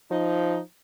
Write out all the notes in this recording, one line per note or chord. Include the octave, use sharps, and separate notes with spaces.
F3 D#4